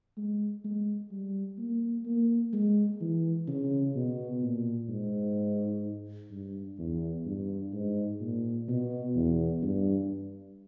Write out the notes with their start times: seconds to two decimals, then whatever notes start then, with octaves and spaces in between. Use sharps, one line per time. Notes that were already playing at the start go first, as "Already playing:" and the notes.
0.17 G#3
0.64 G#3
1.11 G3
1.58 A#3
2.05 A#3
2.53 G#3
3.01 E3
3.47 C#3
3.95 B2
4.42 A#2
4.89 G#2
6.31 G2
6.78 E2
7.26 G2
7.73 G#2
8.20 A#2
8.68 B2
9.15 E2
9.62 G2